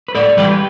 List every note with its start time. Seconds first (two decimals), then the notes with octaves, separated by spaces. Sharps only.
0.08 B4
0.15 A2 A4 D5
0.37 E3 G3 G4 B4